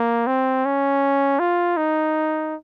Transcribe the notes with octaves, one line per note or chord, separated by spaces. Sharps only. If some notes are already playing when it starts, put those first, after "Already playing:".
Already playing: A#3
C4
C#4
F4
D#4